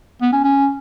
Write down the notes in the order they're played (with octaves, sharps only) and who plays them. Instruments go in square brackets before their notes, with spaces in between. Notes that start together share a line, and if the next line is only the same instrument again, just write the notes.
[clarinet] B3
C#4
C#4